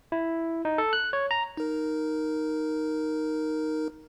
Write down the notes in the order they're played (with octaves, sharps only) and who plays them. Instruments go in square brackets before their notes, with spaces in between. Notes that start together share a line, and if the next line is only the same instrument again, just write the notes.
[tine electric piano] E4
D#4
A4
F#6
C#5
A#5
[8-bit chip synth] D#4 A#4